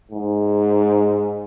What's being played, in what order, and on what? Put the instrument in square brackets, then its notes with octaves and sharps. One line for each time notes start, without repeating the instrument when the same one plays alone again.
[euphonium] G#2